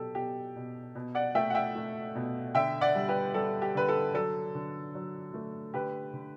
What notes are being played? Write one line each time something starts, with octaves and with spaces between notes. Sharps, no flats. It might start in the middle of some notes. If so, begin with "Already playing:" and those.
Already playing: B2 F#3 G4 A4
B2 G4
B2
B2
D5 F#5
A3 E5 G5
F#5
E5 G5
A3
B2
D3 E5 G5
D5 F#5
G3
G4 B4
G3 A4
G4
D3 B4
A4
F#3 A4
D3
F#3
A3
D3 G4 B4
D3